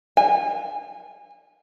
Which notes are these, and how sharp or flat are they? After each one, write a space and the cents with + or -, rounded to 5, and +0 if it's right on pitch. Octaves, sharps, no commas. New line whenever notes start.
G#5 -30